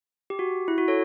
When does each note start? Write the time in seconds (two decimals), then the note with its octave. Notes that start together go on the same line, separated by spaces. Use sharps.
0.30 G4
0.39 F#4
0.68 E4
0.78 F#4
0.88 A4 C#5